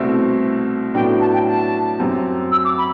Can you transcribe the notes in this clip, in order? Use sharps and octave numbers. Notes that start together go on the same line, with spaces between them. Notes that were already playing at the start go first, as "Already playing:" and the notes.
Already playing: C2 B2 A3 C4 E4
A2 F#3 B3 D4 F#4 G5
A5
G5
A5
F#2 F#3 C4 G4
E6
D6
B5